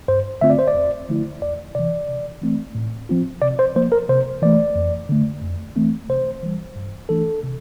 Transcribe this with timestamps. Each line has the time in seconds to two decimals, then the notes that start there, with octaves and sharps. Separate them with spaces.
0.08 G2 C5
0.41 D3 A3 C4 F4 E5
0.50 D5
0.59 C5
0.68 D5
0.74 E2
1.08 D3 F3 A3 E4
1.41 E2 D5
1.75 C3 E3 D5
2.08 C3
2.41 E3 A3 C4
2.75 A2
3.09 F3 C4 F4
3.42 C3 D5
3.59 C5
3.76 F3 A#3 C5
3.92 A#4
4.09 C3 C5
4.42 E3 A3 D5
4.75 F2
5.09 D3 A3
5.42 F2
5.76 E3 A3 C4
6.09 C3 C5
6.43 E3 G3
6.76 G2
7.09 E3 A3 D4 A4
7.43 C3